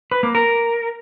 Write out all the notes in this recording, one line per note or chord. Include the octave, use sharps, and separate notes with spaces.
B4
A#3
A#4